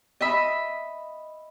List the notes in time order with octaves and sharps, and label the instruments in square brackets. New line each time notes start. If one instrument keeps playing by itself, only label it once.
[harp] D#5 E5 B5